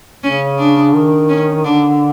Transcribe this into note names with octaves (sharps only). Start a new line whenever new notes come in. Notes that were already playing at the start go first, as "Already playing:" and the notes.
C#3 C#4
D4
D#3
C#4
D3 D4